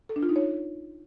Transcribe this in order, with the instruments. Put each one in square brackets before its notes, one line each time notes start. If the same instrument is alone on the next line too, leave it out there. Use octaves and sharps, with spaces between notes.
[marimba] A4
D4
F4
D#4
C#5